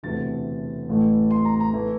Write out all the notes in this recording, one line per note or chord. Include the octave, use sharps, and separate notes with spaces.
E1 D2 C3 E3 A3 A6
A1 A2 E3 A3
C6
A#5
A#5
E3 A3 E4